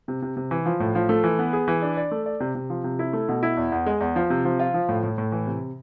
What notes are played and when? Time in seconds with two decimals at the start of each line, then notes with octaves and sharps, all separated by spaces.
0.08 C3
0.22 C3
0.37 C3
0.51 E3
0.66 F3
0.80 A2
0.95 F3
1.09 A3
1.24 E3
1.39 B3
1.53 G#4
1.68 E3
1.82 D4
1.97 D5
2.11 A3
2.26 D5
2.40 C3
2.55 C3
2.70 F3
2.84 C3
2.99 E4
3.13 A3
3.29 B2
3.43 E4
3.57 E2
3.72 E2
3.86 G#3
4.00 E2
4.16 F3
4.30 C3
4.45 F3
4.60 F4
4.74 F3
4.89 A2
5.03 A2
5.18 A2
5.32 E3
5.47 C3